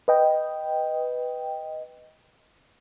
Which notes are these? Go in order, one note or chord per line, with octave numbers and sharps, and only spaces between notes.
B4 D#5 G5